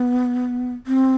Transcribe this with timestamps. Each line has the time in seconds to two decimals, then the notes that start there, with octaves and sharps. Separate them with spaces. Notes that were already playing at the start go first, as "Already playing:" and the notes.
Already playing: B3
0.87 C4